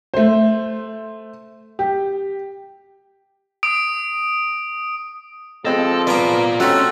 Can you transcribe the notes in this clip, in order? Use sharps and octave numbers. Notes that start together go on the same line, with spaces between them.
A3 C5
G4
D#6 D7
F3 G#3 C4 A4 D#5
B3 F4 D5 A#5
A3 C4 C#4 D#4 F#4